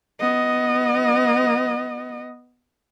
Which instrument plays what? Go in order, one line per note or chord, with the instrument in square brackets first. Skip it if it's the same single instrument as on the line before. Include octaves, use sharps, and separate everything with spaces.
[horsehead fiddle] B3 D#5